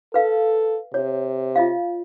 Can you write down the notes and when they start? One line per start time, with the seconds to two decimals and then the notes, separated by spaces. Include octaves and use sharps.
0.14 A4 B4 F5
0.94 C3 C#5
1.56 F4 D#5 F5